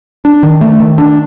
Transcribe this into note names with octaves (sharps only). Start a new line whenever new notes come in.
D4
D#3
A3
D#3
D4